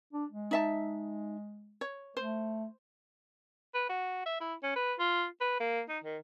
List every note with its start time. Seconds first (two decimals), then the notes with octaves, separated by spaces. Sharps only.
0.13 D4
0.32 G#3
0.51 D#4 E5 A5
1.81 C#5
2.17 A3 C5
3.74 B4
3.89 F#4
4.26 E5
4.41 E4
4.63 C#4
4.76 B4
4.99 F4
5.41 B4
5.60 A#3
5.89 D#4
6.04 D#3